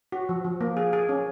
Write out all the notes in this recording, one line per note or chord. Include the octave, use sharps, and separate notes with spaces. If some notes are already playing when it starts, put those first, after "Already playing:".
F#4
F3
F3
A#3
G#4
G#4
C#4